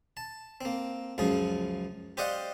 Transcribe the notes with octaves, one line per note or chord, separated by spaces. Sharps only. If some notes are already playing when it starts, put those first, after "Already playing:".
A5
A#3 C4
C#2 F#2 F3 G#4
G4 C5 D5 D#5 F5 F#5